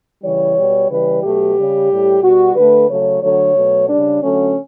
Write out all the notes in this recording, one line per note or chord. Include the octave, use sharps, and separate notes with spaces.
C#3 E3 G3 C#5
B2 G3
C#3 E3 G3 B4
B2 F#3 A3 G4
C#3 G3
A2 G3
B2 G3 F#4
D3 A3 B4
C#3 F#3 A3 C#5
D3 F#3 A3 C#5
B2 F#3 A3
C#3 G3 D4
D3 F#3 A3 C#4